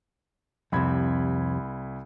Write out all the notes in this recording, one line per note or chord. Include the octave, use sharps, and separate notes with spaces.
C2 F2 A2 C3 B5 G#6